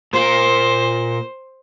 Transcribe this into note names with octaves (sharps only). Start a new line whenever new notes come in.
A#2 A#3 C5